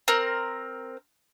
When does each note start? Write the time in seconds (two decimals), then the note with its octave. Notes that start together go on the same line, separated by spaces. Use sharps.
0.08 C4 A#4